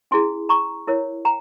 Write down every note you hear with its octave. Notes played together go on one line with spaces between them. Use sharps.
C#4 E4 G#4 G#5 C6
A#5 C#6
E4 A#4 C#5
G5 A#5